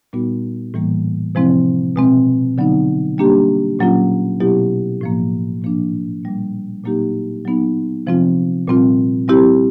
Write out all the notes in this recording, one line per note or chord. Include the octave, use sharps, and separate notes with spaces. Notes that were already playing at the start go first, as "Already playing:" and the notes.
A#2 G3 B3 D#4 F#4
A2 E3 G3 A#3
C3 F3 G#3 C4 E4
B2 G#3 C4
D3 F#3 B3 D#4
G3 A#3 D4 G4
A#2 F#3 A#3 C#4 F4
B2 F#3 B3 E4 G4
A2 F3 A#3
A#2 F3 A#3 D4
A#2 G3 A#3
A#2 F#3 A#3 D#4 G4
F#3 B3 D#4
C3 F3 G#3 C4 F4
A#2 G3 C4 F4
G3 C4 E4 G4